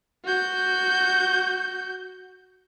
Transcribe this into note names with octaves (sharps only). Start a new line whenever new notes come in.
F#4 G6